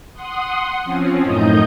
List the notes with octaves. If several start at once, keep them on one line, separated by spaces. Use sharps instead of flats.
F#5 C6 D#6
F3 C4 C#4
F#2 A2 D#4 D#5 D#6 G6